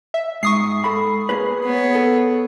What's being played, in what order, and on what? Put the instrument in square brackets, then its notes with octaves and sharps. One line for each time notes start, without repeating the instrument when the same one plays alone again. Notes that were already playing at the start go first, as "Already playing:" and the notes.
[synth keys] E5
[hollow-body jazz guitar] G#2 [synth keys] C#6 D#6 C7
[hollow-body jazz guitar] A4 B5
A#3 G#4 B4
[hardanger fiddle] B3 C#5
[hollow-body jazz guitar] A4